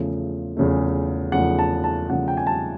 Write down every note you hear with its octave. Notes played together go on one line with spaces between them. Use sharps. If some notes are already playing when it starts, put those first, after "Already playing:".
Already playing: E2 C#3 F3 A3
E2 C#3 F3 A3
E2 C#3 F3 A3 F#5
A5
A5
E2 C#3 F3 A3 F#5
G5
G#5
A5